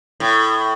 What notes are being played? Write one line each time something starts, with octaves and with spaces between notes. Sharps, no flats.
A2